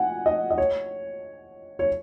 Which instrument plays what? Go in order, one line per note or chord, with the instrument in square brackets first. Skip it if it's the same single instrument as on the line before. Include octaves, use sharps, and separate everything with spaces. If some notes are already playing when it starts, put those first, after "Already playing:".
Already playing: [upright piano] F#5 G#5
D#5
D#5
C#5
C#5